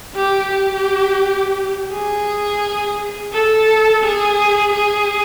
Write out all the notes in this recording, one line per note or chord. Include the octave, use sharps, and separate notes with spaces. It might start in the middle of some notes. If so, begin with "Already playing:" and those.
G4
G4
G#4
A4
G#4
G#4